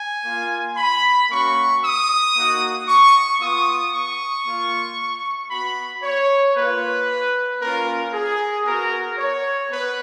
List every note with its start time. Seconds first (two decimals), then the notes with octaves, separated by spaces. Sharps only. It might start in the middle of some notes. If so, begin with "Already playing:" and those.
Already playing: G#5
0.25 A#3 F4
0.77 B5
1.30 A#3 C#4 F#4 C#6
1.82 D#6
2.35 A#3 D#4 F#4
2.87 C#6
3.40 B3 F4 D#6
3.93 C#6
4.45 A#3 F4
5.50 B3 F#4 B5
6.03 C#5
6.55 A#3 F4 B4
7.61 A#3 C#4 F4 A#4
8.13 G#4
8.65 B3 F#4 A#4
9.18 C#5
9.71 B3 B4